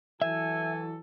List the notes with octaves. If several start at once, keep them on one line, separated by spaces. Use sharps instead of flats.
E3 F#3 A4 E5 G#5